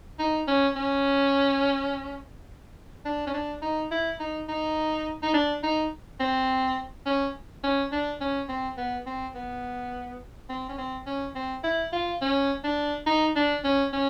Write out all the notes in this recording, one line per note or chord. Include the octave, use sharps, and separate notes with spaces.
D#4
C#4
C#4
D4
C#4
D4
D#4
E4
D#4
D#4
D#4
D4
D#4
C4
C#4
C#4
D4
C#4
C4
B3
C4
B3
C4
C#4
C4
C#4
C4
E4
F4
C#4
D4
D#4
D4
C#4
C#4